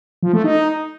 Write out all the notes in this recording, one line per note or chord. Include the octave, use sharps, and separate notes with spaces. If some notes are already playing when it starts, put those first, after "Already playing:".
F3
A3
D#4